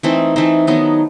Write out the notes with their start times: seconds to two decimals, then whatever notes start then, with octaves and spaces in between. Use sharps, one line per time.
0.03 E3 A3 C4 D#4
0.36 E3 A3 C4 D#4
0.67 D#3 F#3 B3 D#4